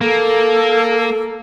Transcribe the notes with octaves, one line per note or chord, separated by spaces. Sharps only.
A#3 A4